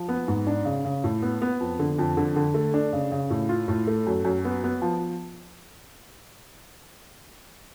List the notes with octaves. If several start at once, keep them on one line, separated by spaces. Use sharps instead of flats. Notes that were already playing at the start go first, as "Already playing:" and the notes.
Already playing: F3
B3
G#2
D4
C#3
C#3
A2
B3
B3
F2
D3
F2
D3
D3
A3
D4
C#3
C#3
A2
F4
A2
A3
F#2
F#2
B3
B3
F3